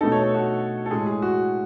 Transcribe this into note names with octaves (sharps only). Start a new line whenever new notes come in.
B2 A3 D#4 A4
C#5
A4
F#4
A4
A2 G#3 C#4 G#4
G#4
F#4